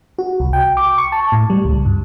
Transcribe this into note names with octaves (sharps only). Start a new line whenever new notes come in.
F#4
C2
G5
D6
C#6
A5
A2
G3
C#2
G2